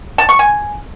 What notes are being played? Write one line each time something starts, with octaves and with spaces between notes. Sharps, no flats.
A5
C#6
G#5